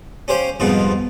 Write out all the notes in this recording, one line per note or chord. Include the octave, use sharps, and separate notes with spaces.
C#4 G4 C5 F5
C2 F2 G#2 B2 F4